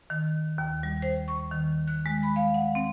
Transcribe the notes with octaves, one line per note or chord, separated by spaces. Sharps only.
D#3
D#2
G3
C5
C#6
D#3
F#6
G#3
B5
F5
F#5
C4